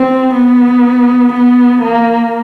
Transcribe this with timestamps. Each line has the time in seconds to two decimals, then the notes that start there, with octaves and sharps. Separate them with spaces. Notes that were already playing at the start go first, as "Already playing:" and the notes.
Already playing: C4
0.34 B3
1.33 B3
1.82 A#3